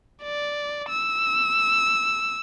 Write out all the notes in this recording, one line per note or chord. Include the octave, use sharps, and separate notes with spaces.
D5
E6